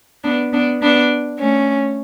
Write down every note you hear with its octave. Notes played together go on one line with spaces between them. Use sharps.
B3 D4
B3 D4
B3 D4
A3 C#4